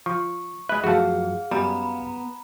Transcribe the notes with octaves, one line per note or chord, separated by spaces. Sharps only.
F3 C#6
G#3 B4 E5 F#6
F#2 F3 A3 F#4 G#4 F5 F#5 A5
F#2 G3 B3 A#5 B5